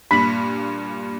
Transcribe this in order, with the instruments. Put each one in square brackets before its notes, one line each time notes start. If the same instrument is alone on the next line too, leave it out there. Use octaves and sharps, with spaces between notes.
[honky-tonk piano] G2 A#2 [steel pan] B5